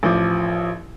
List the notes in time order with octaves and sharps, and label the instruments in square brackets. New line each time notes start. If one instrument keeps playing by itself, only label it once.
[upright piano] A1 F3 D6